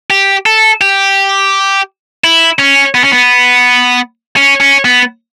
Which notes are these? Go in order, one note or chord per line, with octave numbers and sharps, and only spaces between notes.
G4
A4
G4
E4
C#4
B3
C#4
B3
C#4
C#4
B3